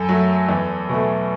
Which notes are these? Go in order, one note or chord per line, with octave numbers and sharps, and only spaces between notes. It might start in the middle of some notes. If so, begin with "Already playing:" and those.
Already playing: F#2 A4
F#3 A3
E2
B2 A3